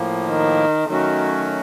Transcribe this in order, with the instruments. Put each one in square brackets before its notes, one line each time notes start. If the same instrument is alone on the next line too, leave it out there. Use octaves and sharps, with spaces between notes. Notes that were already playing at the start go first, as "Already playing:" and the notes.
Already playing: [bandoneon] A2 F3 A#3
[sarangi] D#3
[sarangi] D#3 [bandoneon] F#3 A3 C#4 F#4